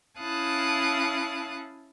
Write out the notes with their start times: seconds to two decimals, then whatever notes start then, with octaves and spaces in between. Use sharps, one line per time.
0.20 C#4 E4 F5 A5 D#6 F#6